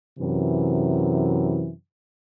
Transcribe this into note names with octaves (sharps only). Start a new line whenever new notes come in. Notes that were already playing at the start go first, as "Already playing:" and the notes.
F#2 C3 E3